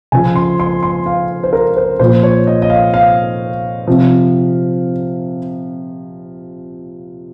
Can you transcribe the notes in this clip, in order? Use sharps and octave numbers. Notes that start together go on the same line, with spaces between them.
C#3 F3 G#5
C6
C6
C6
F5
C5
A#4
C5
A#2 F3 C5
C#5
D#5
D#5
F5
F5
C3 F3